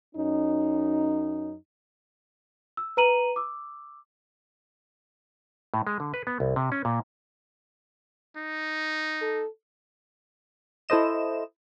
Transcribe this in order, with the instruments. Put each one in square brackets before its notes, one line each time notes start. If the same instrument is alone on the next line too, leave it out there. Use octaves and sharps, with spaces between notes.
[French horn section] F#2 C#4 D#4
[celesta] E6
B4 A#5 D#7 F#7
D6 E6
[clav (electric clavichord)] A2
G#3
D3
B4
B3
C2
C3
C#4
A#2
[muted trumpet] D#4
[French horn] A4
[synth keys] E4 A4 C5 D#5 E7